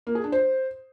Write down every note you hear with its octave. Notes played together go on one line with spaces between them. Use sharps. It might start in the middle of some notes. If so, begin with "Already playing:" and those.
A#3
G#4
D4
C5